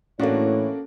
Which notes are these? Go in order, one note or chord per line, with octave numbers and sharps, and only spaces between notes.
A2 E3 A#3 C#4 D4 F#4 A4 C#5